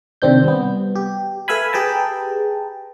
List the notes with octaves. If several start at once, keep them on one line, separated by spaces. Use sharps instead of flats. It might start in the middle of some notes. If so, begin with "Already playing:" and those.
C3 D#3 C4 D4 G6
G3 B3
G4
A4 B4 E5 F5 G#5 B5
G4 G#4 B4 G5 A5 A#5